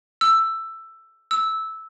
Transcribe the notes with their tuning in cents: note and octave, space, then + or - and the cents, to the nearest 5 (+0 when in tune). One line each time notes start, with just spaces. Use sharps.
E6 +10
E6 -10